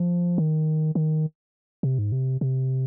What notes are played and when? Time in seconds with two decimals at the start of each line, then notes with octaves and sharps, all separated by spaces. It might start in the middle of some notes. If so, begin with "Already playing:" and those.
Already playing: F3
0.38 D#3
0.95 D#3
1.83 C3
1.99 G#2
2.12 C3
2.41 C3